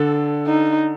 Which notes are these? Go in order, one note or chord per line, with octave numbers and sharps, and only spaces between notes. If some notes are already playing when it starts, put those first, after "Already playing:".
Already playing: D3 A4
D#4